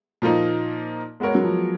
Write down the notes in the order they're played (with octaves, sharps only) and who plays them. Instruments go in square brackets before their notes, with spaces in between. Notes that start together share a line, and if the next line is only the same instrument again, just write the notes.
[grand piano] A#2 F3 A#3 D#4
G#3 B3 F#4 A#4 C#5
[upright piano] F#3
F3